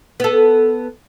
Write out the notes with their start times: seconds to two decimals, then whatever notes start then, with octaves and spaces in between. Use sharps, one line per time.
0.20 B3 A4